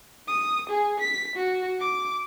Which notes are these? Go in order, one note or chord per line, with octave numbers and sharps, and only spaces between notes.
D#6
G#4
B6
F#4
D6